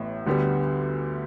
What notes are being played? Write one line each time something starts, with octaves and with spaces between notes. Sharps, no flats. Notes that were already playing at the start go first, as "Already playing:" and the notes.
Already playing: A1 A2 E3 B3
D2 D3 G3 B3